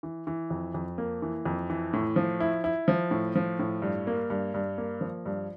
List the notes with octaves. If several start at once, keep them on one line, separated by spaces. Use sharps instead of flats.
E3
E3
F2
F2
A#3
E3
F2
E3
A2
F3
E4
E4
F3
A2
F3
A2
G2
A#3
G2
G2
A#3
F3
G2